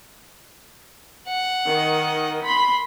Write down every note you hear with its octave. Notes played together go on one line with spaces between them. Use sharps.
F#5
D#3 D#5
B5 C6